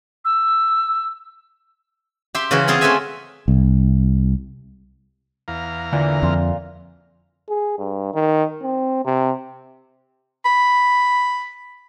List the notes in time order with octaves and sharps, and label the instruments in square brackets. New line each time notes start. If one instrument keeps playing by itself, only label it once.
[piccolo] E6
[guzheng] G4 E5 C6
C#3 E3 C#4 F#4 C5
B3 C4 F4 G#4 F5
A3 C#4 F#4 C5 E5 G#5
[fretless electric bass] C2
[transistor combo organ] E2 F5 A#5
[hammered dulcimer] A#2 E3 [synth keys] D3
[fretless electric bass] F2 [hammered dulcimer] F4
[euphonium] G#4
G2
D#3
C4
C3
[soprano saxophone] B5